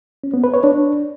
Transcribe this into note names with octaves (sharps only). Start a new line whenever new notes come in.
C#4
B3
B4
C#5
D4